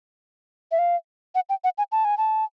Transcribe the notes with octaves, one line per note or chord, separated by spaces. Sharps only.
E5
F5
F#5
G5
F#5
G#5
A5
G#5
A5